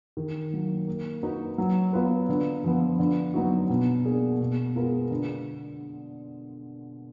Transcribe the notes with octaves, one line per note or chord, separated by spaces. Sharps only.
D#3
F#3 A#3
A#3
D#4 F#4 B4
F#3
B3 F4 B4
D3
F3 B3
D3
F#3 B3 D#4 F#4
B2
A#3 D4 G#4
B2
G#3 B3 F4 A#4
D3